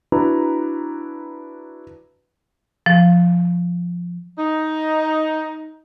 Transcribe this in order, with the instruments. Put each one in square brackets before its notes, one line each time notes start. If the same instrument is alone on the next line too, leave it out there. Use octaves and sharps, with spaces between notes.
[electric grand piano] D4 E4 F#4 B4 A#5
[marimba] F3
[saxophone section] D#4